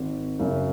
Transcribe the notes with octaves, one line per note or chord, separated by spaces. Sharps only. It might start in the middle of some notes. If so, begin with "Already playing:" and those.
Already playing: G#1
F#2 C#3